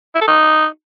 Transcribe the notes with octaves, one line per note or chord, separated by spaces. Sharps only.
E4
A4
D#4